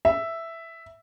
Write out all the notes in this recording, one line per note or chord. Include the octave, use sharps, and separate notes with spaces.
E5